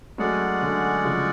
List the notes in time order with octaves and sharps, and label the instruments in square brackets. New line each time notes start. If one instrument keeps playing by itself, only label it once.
[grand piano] F#3 A3 [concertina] G#3 C#4 G#4 D5 F#5
[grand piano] D3 F#3
C#3 F3